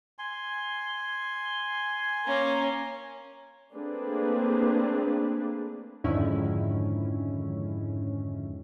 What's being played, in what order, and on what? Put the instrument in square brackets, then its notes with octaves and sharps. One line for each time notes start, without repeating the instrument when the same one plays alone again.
[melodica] G#5 C6
[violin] A#3 C#4
[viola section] A3 A#3 C4 D4 G#4 B4
[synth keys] F2 G#2 D3 D#3 C#4 E4